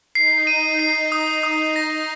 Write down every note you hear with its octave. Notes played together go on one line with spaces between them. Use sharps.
D#4 C7
D#7
C7
D#6
D#6
A#6